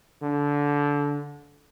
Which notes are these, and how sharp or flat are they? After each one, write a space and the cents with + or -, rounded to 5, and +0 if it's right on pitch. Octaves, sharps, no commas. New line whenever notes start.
D3 -20